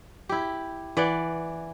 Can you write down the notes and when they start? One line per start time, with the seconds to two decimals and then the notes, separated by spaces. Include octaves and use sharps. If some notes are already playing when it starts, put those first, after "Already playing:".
0.29 E4 G4
0.97 E3 D5 F#5